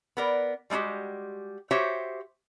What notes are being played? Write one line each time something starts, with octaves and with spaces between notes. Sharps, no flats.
B3 A#4 D5
G3 G#3 C#4 F#4 G4
F#4 G4 C5 C#5 E5